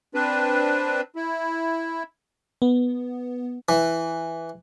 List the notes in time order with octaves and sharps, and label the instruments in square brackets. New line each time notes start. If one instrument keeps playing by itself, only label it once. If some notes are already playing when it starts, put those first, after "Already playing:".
[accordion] C4 D4 B4
E4
[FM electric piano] B3
[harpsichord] E3